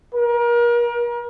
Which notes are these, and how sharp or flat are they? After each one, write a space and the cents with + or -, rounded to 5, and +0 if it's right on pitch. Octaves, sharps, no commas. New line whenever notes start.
A#4 +35